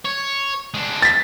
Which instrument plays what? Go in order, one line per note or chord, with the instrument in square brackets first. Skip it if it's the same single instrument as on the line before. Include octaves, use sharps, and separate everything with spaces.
[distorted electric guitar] C#5
G#3 D4
[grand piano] A6 B6